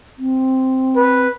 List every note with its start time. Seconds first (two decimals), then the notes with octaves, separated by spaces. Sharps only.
0.18 C4
0.96 B4